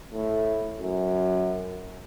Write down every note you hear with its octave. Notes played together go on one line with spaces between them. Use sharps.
A2
F#2